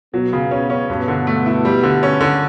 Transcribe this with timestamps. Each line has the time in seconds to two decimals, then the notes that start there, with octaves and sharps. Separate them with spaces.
0.14 B2 F#3 B3
0.33 C#3
0.51 C#4
0.70 C#4
0.89 G2 B2 B3
1.08 D3
1.27 A3
1.46 E4
1.65 G3
1.83 D3
2.03 C#4
2.20 D3